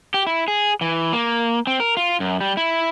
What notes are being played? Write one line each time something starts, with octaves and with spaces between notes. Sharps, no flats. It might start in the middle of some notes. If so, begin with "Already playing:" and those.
G4
E4
G#4
E3
A#3
C4
A#4
F4
F#2
G3
E4